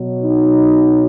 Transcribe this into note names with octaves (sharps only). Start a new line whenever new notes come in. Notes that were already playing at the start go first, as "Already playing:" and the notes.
Already playing: B2 F#3
D#4